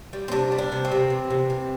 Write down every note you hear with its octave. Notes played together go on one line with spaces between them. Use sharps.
G3
C4
C3 D4
G3
D4
C3
C4
C3
E3
C3
E3